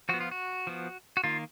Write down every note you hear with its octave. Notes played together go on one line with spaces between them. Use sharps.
F3 B3 F#4
F4
F#4
F3 B3
F#4
D#3 A#3 F4